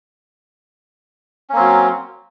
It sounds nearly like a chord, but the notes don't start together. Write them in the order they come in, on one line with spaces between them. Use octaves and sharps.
C#4 A#3 C4 F#3